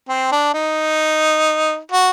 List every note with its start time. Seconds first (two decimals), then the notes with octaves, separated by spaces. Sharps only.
0.09 C4
0.32 D4
0.54 D#4
1.92 F#4